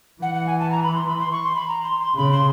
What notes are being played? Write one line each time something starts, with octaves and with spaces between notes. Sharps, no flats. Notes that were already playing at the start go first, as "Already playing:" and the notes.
E3 F#5
F#5
G#5
A5
A#5
B5
C6
B5
C6
C#6
C6
B5
A#5
C6
C6
C#3 B5
C6